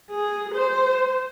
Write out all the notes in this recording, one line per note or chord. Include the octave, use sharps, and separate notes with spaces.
G#4
C5